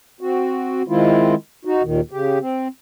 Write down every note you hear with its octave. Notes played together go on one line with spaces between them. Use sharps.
C4 F#4
D#3 G#3 C4 E4 F4
D#4 F#4
D#2 A#2 D#3
C#3 G4
C4